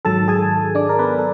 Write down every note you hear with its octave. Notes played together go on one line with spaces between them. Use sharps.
G#2 D#3 F#3 A4 A5
G#4 G#5
D4 D5
A#4
B3 B4
A4